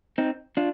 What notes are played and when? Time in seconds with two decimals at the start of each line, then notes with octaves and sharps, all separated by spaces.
0.18 C4 D#4
0.57 D4 F4